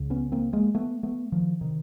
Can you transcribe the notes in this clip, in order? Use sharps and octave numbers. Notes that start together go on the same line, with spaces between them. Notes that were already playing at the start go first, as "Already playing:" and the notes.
Already playing: C#2 C#3
B3 C#4
A#3 C4
G#3 A#3
A3 B3
A3 B3
D#3 F3
C3 D#3